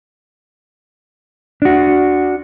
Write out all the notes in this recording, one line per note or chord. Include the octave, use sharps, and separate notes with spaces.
D4 F#4